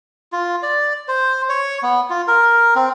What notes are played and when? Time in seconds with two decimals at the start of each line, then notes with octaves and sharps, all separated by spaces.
0.32 F4
0.63 D5
1.08 C5
1.49 C#5
1.83 B3
2.10 F4
2.28 A#4
2.76 C4